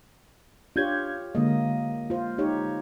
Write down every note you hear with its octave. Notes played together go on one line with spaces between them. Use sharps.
D4 F4 G4 C#5 G6 G#6
D3 G#3 A#3 D#5
F4 C5
D#4 G4 C#5